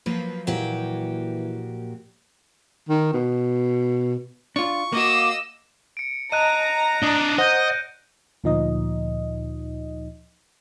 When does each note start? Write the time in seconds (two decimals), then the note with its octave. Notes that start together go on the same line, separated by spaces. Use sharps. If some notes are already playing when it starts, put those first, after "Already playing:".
0.06 F3 F#3 A#3 B4
0.47 A#2 E3 F#4 G4
2.89 D#3
3.13 B2
4.56 D4 F4 C#6
4.93 A#3 F#4 D#5 F5 D6 E6
5.97 C#7 D7
6.32 D#5 A5 A#5 F#6 D#7
7.03 D4 D#5
7.38 C5 D#5 F#5 G6 A#6
8.44 D2 A#2 F3 D#4 D#5